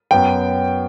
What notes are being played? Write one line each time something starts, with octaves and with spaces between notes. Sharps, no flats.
F#2 F#3 B3 G5